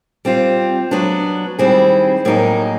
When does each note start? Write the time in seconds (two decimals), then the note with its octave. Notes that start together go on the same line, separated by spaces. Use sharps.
0.25 G3 C4 F4
0.91 F#3 B3 D4
1.59 D#3 G3 C4 E4 G#4
2.25 A2 F#3 A#3 D#4 G#4